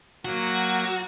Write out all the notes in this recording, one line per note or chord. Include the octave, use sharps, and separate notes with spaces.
F#3 A#3 F#4